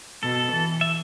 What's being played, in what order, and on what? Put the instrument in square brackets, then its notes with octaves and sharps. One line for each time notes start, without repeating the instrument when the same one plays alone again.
[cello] B2 [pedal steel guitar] A4
[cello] E3
[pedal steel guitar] E5